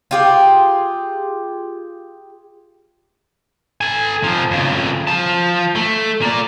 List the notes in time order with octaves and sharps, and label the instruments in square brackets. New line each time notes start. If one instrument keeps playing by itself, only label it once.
[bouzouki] F4 G4 G#4
[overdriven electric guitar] A4 G#5
C3 F3
F2 C#3
F3 A5
A3
A#3 D5